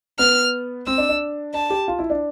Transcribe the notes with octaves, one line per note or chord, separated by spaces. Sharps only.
B3 F6
C4 E6
D4
D4
D4 A5
G4
F4
E4
D4